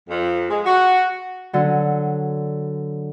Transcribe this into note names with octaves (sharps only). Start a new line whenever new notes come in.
F2
G#3
F#4
D3 F#3